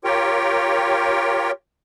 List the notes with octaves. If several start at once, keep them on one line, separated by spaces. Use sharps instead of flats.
F4 G4 A#4 C#5 G5